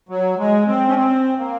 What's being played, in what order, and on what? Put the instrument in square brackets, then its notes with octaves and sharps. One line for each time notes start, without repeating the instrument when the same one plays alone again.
[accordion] F#3
G#3
C4
C#4
C4
A#3